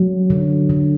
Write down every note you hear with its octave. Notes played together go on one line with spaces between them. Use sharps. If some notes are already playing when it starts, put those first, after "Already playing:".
Already playing: F#3
D3
D3